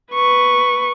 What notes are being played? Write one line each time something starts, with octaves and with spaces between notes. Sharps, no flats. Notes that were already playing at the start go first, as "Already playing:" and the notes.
B4 C#6